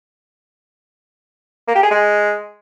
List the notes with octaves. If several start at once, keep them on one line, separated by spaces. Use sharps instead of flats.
A#3
G4
G#4
G#3